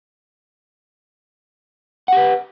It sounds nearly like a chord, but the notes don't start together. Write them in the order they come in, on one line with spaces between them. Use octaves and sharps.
F#5 G4 B4